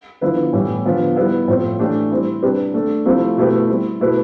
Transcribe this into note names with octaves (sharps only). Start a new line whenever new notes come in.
D3 F3 B3 E4 B4
A2 E3 G3 B3
D3 F3 B3
G3 B3 E4 B4
A2 F3 C4 F4 C5
E3 A3 D4 G4
G3 C4 E4
C3 G3 D4 G4 B4
A3 D4 A4
C3 F3 A3 C4 E4
B2 A3 E4 G4 B4
G3 C4 E4
B2 A3 E4 B4